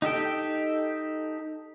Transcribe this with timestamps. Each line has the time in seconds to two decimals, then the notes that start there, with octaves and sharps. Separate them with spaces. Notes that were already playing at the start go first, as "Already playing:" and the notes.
0.02 D#4 G4 A4 G5